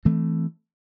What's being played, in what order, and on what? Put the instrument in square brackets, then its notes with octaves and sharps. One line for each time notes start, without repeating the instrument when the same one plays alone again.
[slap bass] E3 A3 C4